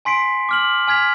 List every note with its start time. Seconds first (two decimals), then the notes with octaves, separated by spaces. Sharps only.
0.05 G#5 C6 B6 C7 D7
0.49 D6 F6 F#7
0.88 G#5 F6 G#6 B6 F7